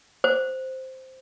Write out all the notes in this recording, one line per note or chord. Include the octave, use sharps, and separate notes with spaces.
C5